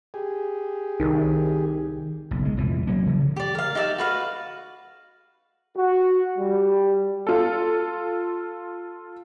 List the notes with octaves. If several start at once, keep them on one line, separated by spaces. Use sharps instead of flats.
G4 G#4
C2 D#3
F#1 B1
G#3
C2 F2 A#2 E3
F#3 A#3 C#4
C#3 E3 F3
G4 D5
A#4 F5
D#4 G4 D5 E5
F#4 B4 F5
F#4
G3
F4 A4